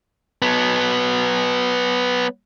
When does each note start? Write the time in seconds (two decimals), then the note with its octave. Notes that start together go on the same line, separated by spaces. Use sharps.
0.42 F#3 B3